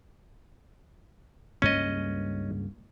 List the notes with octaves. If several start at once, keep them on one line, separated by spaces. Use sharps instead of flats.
C#2 G2 A#3 C#4 D#5